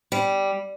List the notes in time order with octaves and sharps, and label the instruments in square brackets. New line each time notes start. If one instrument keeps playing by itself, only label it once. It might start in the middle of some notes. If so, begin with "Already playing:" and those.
[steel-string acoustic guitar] G3